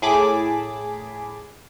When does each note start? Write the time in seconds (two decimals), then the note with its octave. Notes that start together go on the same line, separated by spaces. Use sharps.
0.02 A2 G#4 A5 B5 D6